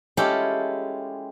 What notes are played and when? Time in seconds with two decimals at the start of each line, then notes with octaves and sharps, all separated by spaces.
0.17 G#3 C#4 E4 F4 G4 A4